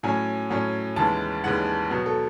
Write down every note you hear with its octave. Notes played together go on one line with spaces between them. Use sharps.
A2 F#3 C#4 G#5
A2 F#3 C#4
D#2 C#3 E3 G#3 A5
D#2 C#3 E3 G#3 F#5
B2 F#3 B3
A4